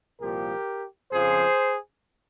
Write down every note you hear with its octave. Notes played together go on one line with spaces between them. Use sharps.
C2 A#2 F3 G4 A#4
F2 C#3 F3 G#4 C5